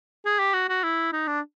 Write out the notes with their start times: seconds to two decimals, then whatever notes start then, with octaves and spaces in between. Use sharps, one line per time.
0.25 G#4
0.39 G4
0.54 F#4
0.69 F#4
0.83 E4
1.12 D#4
1.27 D4